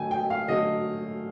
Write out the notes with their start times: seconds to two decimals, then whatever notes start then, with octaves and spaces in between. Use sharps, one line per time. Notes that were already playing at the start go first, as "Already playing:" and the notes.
Already playing: D3 F#3 A3 G5 G#5
0.11 G5
0.30 F5
0.48 D3 F#3 A3 D#5